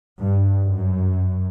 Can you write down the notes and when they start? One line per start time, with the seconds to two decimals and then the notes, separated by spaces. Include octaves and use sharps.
0.21 G2
0.64 F#2